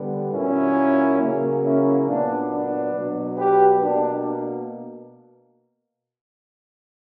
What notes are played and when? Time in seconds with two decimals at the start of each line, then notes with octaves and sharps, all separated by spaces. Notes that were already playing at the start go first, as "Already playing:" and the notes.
Already playing: D3 G3 B3
0.33 A#2 F#3 A#3 C#4 E4
1.21 C#3 F#3 A#3
1.63 C#4 E4
2.07 A#2 F#3 B3 D4
2.50 D4
2.93 B2 F#3 B3
3.36 G4 B4
3.80 B2 A#3 D4